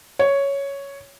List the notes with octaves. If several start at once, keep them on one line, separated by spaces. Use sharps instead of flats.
C#5